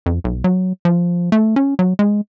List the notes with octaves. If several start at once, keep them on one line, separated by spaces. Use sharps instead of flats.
F2
B1
F#3
F3
A3
C#4
F#3
G#3